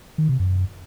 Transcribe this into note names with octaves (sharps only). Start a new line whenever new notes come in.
D#3
C3
F#2